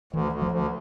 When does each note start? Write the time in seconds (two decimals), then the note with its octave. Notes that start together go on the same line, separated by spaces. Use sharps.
0.13 D2 E3
0.32 D2
0.42 F3
0.51 D2